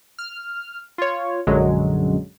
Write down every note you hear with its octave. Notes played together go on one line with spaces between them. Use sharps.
F6
F4 C#5
A#1 F#2 D3 F#3 G#3